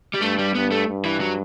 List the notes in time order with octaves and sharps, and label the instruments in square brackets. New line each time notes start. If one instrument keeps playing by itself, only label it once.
[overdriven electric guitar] G3
[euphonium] G2 [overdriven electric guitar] A3
[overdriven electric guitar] G3
[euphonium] G2 [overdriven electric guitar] B3
[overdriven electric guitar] A3
[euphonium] G2
[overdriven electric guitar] E3
F#3